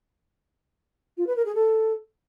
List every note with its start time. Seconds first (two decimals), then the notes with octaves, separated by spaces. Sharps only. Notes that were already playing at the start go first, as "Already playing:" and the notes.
1.17 F4
1.27 B4
1.36 A#4
1.45 G#4
1.55 A4